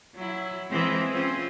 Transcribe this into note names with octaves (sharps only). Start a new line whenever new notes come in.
F#3 E4
E3 G#3 C4
C4 C#4 F4